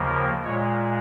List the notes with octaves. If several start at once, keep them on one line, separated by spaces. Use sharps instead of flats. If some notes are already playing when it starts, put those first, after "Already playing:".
Already playing: D#2 C#3 F3 A#3
A#4
A#2 G#3 C#5